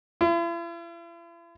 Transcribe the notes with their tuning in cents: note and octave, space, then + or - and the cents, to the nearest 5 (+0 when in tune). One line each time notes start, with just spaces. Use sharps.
E4 +45